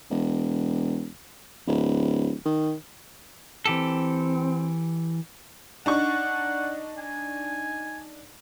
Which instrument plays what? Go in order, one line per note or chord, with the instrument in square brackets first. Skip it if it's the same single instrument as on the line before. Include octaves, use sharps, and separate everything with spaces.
[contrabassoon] E1
D1
D#3
[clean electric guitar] E3 G4 A4 [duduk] C4
[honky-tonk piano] D4 D#4 C#6 [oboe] F#5
[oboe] G#5